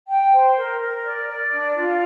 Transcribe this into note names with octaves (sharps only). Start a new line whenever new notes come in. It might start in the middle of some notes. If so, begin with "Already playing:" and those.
G5
C5
A#4
A#4
D5
D5
D4
F4